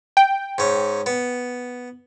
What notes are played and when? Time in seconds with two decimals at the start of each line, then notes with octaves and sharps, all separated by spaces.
0.17 G5
0.58 G#2 C#4
1.06 B3